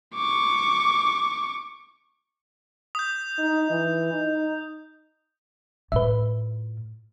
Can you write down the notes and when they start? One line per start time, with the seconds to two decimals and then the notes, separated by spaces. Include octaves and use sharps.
0.15 C#6 D6
2.95 D#6 G6
3.39 D#4
3.70 E3
4.13 D#4
5.92 A2 F4 B4 E5